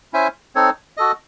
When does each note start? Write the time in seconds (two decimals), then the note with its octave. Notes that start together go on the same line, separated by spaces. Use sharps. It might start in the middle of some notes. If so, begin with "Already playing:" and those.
0.13 C#4 E4 C5 E5 G#5
0.55 C4 D#4 A4 C#5
0.97 F#4 A4 D#5